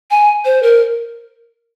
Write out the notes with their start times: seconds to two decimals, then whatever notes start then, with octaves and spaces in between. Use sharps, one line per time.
0.11 G#5
0.45 C5
0.63 A#4